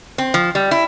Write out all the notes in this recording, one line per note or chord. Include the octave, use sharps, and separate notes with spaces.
C4
F3
G3
E4